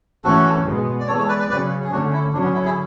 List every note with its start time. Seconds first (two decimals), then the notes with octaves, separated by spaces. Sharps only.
0.24 E3 A3 C#4 F#4 A4
0.66 B2 G#3 B3
1.00 D5
1.08 E3 G#3 B3 A4 C#5
1.18 A4 C#5
1.28 B4 D5
1.39 B4 D5
1.49 C#3 F#3 C#4 B4 D5
1.84 G#4
1.91 D3 A3 C#4 D4 F#4
2.13 E4
2.33 D3 F#3 C#4 D4
2.44 B3
2.54 E4
2.65 E4 G#4